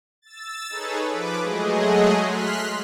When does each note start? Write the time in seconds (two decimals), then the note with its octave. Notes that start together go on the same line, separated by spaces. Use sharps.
0.22 E6 A6
0.69 D#4 G#4 A4 B4 C#5
1.09 F3 B4 D6
1.38 F#3 G#3 A3 G#4 D#5
2.22 C6 F6 F#6 B6